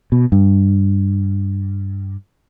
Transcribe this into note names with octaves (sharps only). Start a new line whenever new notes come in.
B2
G2